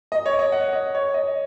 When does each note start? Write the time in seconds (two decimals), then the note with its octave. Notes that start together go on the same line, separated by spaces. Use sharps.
0.12 D#5
0.26 C#5
0.39 D#5
0.52 F#5
0.73 D#5
0.95 C#5
1.14 D#5